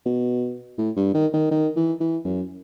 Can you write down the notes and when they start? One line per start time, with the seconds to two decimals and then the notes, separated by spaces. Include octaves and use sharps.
0.06 B2
0.78 A2
0.96 G2
1.14 D#3
1.33 D#3
1.51 D#3
1.76 E3
2.00 E3
2.25 F#2